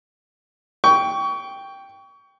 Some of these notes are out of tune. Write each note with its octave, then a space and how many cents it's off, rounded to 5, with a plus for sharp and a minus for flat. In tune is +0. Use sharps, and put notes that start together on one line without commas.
G5 +0 C#6 +30